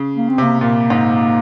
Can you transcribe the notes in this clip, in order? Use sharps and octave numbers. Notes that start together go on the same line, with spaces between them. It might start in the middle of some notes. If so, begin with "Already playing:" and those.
Already playing: C#3
A#3
C4
C3
A#3
A#2 A#3
G#2